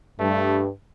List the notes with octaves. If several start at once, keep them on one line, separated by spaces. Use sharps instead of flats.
G2 A3